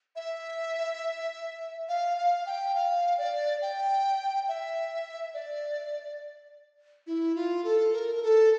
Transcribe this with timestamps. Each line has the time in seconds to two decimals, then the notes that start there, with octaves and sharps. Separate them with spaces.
0.16 E5
1.89 F5
2.17 F5
2.46 G5
2.75 F5
3.18 D5
3.62 G5
4.48 E5
5.34 D5
7.07 E4
7.35 F4
7.64 A4
7.93 A#4
8.15 A#4
8.23 A4